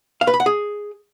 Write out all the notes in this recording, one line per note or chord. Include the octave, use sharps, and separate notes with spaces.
F5
B4
B5
F#5
G#4